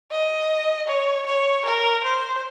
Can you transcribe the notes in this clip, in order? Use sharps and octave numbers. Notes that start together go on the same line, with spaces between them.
D#5
C#5
C#5
A#4
C5